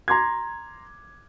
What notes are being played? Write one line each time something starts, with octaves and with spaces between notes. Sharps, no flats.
A#5 C6 D6 G#6